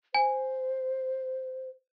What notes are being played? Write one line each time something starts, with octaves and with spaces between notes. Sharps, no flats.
C5 G#5